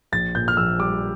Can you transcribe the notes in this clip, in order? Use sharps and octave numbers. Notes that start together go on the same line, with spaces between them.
A#1 A6
A#2 G6
F6
A#1 E6
G3 D6